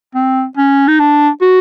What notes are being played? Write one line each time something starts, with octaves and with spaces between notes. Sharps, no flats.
C4
C#4
D#4
D4
F#4